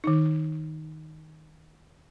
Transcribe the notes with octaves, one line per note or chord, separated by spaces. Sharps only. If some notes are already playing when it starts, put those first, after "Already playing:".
D#3 D#4